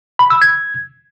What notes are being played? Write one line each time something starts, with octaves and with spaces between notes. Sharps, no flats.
B5
E6
G#6